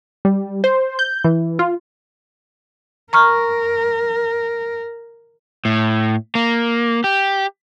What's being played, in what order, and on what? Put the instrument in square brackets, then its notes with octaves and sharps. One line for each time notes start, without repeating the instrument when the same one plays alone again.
[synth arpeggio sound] G3
C5
G6
E3
F4
[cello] A#4 [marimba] A#5 C#6 F6
[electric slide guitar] A2
A#3
G4